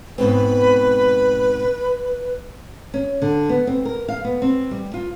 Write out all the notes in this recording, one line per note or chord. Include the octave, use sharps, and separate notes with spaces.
G#2 B2 C4 B4
C#4
D3
B3
C4
A#4
F5
B3
C4
G3
F4